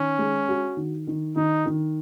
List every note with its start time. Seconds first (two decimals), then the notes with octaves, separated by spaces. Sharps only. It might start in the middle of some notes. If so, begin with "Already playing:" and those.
Already playing: D#3 C#4
0.19 G#3
0.48 F#4
0.77 D#3
1.07 D#3
1.36 D#3 D#4
1.66 D#3